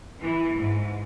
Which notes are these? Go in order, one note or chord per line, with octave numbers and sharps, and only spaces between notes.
E3
G#2